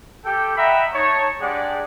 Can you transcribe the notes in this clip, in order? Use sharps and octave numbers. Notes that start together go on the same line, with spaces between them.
G4 A4 G5
D#5 E5 F#5 G5 A#5 B5
D#4 C#5 A5
G#3 D4 G4 G#4 D5 F#5